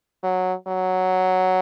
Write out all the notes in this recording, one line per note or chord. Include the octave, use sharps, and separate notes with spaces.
F#3
F#3